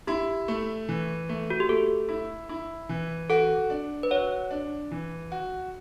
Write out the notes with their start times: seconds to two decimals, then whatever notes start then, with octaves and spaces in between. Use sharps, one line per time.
0.07 E4 G4
0.48 A3
0.89 E3
1.29 A3
1.50 F#4
1.60 G4
1.69 A3 A4
2.09 E4
2.49 E4
2.89 E3
3.30 F#4 A4
3.70 D4
4.03 B4
4.11 F#4 C#5
4.51 D4
4.91 E3
5.32 F#4